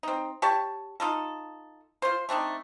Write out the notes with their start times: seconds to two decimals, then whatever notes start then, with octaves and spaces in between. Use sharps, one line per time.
0.03 C4 D#4
0.42 G4 C#5 A5
1.00 D#4 F4 A4
2.02 F4 C5
2.29 A3 C4 D4 D#4